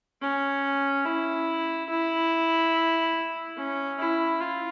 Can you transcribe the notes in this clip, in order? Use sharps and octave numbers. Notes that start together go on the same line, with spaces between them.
C#4
E4
E4
C#4
E4
F4